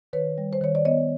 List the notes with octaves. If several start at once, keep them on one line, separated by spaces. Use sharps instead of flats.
D#3 B4 C#5
G3
C5
D#3 C#5
D5
B3 C#5 D#5